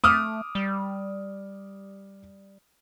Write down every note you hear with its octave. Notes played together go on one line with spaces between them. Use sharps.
A3 D6 D#6 F6
G3